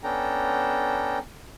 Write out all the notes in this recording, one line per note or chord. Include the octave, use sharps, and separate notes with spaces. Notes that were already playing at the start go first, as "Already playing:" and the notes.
B3 C#4 D4 A4 G5 A#5